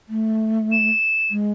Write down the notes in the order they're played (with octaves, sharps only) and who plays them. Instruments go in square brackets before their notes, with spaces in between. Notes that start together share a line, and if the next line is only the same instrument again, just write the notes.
[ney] A3
[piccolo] E7
[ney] G#3